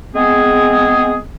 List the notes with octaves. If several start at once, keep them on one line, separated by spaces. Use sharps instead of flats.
G#3 B3 C4 G#4